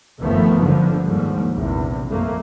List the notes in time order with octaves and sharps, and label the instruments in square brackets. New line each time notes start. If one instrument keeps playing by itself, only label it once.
[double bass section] G1 D#2 D#3 F3 A3 B3
D3 F3 G3
D#2 G#2 F3 G3
A#1 E2 C3
F2 A3 A#3